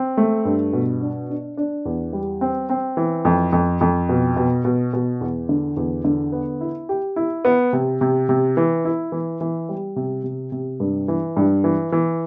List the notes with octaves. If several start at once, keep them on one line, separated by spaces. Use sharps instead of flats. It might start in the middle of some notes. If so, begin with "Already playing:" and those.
Already playing: C4
A3
G2
B2
D4
D4
D4
E2
G3
C4
C4
E3
F2
F2
F2
B2
B2
B2
B2
E2
D3
E2
D3
B3
E4
G4
E4
B3
C3
C3
C3
E3
E4
E3
E3
G3
C3
C3
C3
G2
E3
G2
E3
E3